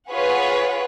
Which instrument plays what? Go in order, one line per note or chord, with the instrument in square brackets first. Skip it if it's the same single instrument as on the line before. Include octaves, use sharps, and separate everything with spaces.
[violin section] F4 G#4 B4 C#5 F#5